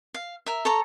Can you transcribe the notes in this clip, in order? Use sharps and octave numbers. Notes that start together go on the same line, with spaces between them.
F5
A#4 E5
A4 C#5 A#5